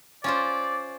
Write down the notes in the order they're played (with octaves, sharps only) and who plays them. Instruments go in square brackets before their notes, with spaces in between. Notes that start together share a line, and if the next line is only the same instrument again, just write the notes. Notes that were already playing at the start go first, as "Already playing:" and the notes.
[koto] C#4 F4 C5 [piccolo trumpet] D5